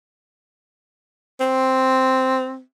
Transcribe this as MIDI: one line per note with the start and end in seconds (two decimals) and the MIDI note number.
1.41 2.61 60